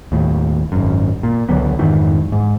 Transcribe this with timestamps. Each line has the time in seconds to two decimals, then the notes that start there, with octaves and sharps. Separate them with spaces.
0.12 D#2 A2
0.72 G#1 F#2
1.23 A#2
1.49 C#2 D3 F#3 B3
1.79 F2 G#2 D#3 E3
2.32 G#2